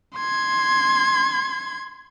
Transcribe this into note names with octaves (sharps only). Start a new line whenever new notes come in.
C6 G#6